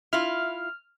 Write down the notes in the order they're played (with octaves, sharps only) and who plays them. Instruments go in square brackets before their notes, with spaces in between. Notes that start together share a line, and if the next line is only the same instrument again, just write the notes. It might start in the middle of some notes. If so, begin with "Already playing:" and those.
[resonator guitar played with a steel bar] E4 F4 [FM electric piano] F6